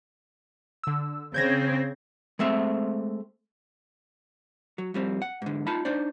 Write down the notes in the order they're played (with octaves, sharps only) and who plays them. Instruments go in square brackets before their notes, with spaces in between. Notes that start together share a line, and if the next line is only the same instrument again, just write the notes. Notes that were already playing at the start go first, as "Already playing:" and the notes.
[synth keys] D3 E6
[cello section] C#3 C4 [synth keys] G6 G#6 A#6
[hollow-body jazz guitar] G#3 A3 C4 E5
F#3
F2 G3 C4
F#5
G#2 D3
D#4 F4 A5 B5
D4 D#4 C5 D5